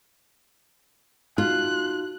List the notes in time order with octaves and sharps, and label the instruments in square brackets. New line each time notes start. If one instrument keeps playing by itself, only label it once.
[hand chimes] D#4 F#4 [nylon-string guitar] F4 [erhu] F#6